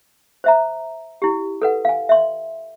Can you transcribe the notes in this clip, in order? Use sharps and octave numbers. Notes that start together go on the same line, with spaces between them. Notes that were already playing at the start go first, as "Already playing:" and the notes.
C5 E5 A#5
E4 G4
A4 B4 F#5
F5 G#5
E5 C6